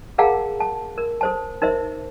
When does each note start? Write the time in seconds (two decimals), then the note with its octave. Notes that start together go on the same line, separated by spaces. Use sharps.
0.18 G#4 A#4 F5 F#5 A5 A#5
0.60 A5
0.98 A#4
1.21 A4 C5 A5
1.62 D#4 A#4 C5 E5